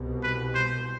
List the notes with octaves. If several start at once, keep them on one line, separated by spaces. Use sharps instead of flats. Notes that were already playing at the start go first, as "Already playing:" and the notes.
Already playing: C2 B2 G3
B4
C5